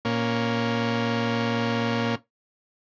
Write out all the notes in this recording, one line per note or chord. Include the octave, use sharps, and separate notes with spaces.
A#2 A#3 C#4